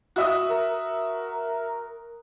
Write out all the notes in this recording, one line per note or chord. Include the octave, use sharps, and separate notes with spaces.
F#4 E5 D#6
A#4